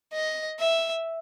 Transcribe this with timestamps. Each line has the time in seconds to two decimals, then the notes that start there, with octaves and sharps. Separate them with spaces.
0.13 D#5
0.60 E5